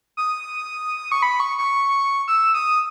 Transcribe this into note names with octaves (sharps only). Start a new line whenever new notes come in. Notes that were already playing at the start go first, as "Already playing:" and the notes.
D#6
C#6
B5
C#6
C#6
E6
D#6